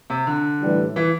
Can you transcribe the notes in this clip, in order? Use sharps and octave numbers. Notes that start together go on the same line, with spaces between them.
C3
D3
A2 E3 G3
E3